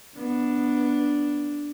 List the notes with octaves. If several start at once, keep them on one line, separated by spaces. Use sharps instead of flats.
B3 D4